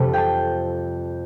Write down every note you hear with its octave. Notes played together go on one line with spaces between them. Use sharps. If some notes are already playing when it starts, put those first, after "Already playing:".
Already playing: F2 C3 G3 A4
G5 A5